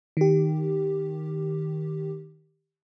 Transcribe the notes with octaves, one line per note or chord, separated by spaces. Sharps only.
D#3 G4